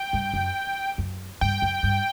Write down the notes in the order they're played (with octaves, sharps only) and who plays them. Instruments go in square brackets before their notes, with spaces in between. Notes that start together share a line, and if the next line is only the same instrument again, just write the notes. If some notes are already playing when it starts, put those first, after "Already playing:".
Already playing: [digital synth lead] G5
[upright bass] G2
F#2
F#2
[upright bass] G2 [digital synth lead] G5
[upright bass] F#2
G2